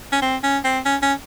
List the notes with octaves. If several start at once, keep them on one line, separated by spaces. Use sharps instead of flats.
C#4
C4
C#4
C4
C#4
C#4